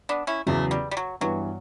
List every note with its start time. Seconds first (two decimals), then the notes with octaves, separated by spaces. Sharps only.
0.09 B3 D4
0.27 C#4 E4
0.46 E2 C#3 F#3 A3
0.71 G3
0.91 G3
0.97 F#3
1.21 G2 E3 F#3 B3